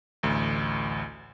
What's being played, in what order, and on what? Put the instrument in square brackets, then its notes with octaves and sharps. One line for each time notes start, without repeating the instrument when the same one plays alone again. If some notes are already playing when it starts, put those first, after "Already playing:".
[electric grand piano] A1 D2